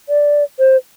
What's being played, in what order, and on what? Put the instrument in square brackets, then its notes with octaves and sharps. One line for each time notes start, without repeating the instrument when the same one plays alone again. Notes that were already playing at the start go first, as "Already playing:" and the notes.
[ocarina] D5
C5